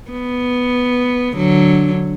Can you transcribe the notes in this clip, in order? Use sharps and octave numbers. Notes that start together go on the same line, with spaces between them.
B3
D3 F#3